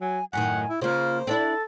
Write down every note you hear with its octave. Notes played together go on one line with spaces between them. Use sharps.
F#3 G#5
F#2 A2 D#3 F#5 G#5
E4
C#3 A#3 F4 C5
C4 D4 E4 A4